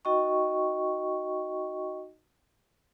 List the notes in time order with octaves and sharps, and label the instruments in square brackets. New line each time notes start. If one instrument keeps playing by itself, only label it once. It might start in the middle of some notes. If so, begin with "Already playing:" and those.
[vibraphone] D#4 F#4 D#5 G5 C#6